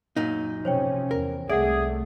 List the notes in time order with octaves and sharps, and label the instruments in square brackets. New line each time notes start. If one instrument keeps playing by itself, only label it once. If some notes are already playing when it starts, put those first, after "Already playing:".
[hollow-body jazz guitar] F#2 A#2 D#4
[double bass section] C3 F3 C#4 [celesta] C5 C#5 G5
[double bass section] E2 [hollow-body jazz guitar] A#4
[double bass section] C2 A3 [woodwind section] G#4 [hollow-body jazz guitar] D5 [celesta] E5 F#5